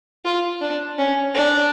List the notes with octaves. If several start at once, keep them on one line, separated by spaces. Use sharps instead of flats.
F4
D4
C#4
D4